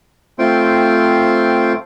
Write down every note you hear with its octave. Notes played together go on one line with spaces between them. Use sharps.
A3 C4 F4 C5 G5 C6